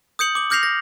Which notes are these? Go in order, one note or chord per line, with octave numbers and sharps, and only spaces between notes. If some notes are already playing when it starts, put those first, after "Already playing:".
D#6 G6 C#7 F#7
D6 F#7
D6 F6 G6 A#6 C7 F7
A#6